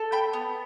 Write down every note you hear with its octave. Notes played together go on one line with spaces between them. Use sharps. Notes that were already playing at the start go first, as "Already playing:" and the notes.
Already playing: A4
G5 B5
B3